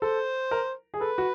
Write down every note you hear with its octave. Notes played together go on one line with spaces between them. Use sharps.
A4 C5
A#4
G#4
A4 B4
F#4